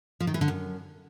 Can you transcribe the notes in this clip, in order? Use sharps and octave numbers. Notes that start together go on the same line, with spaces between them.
F3
D#3
E3
D3
F#2